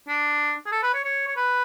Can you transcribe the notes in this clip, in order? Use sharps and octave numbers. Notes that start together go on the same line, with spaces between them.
D4
G#4
A4
B4
C#5
C#5
C#5
B4